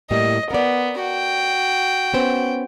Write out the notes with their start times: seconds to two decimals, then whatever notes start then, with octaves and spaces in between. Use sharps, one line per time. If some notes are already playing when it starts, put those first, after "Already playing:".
0.11 A2 G3 A#3 D#5
0.51 B3 A#4 D5
1.01 F#4 G5
2.14 B3 C#4 C5